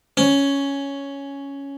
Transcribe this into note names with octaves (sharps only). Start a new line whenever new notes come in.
C#4